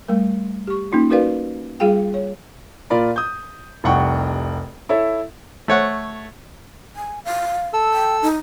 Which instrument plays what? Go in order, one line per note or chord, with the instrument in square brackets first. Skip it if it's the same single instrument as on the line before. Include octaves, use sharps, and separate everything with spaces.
[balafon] G3 A3 A#4
G4 C#6
A#3 C#4 D#4 F4
D#4 F#4 A#4 B4 D5 F5
G3 F4 G#4 F5 G5
C#5
[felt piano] A#2 F4 A#4 D5 B5
D#6 G6
F1 C2 F#5 G5 C#6
E4 A4 C#5 E5
[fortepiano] A3 C#5 F#5
[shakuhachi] G#5
F5
[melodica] A4 E6
[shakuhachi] G5
D#4